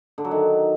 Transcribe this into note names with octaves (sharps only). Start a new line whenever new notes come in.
D3
F#3
D#3